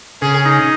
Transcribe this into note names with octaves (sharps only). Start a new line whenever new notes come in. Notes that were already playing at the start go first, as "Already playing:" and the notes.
C#3 G#4
D#4